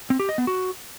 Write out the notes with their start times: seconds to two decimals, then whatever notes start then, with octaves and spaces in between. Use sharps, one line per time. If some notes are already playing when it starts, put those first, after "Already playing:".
0.10 C4
0.20 G4
0.29 D#5
0.38 B3
0.47 F#4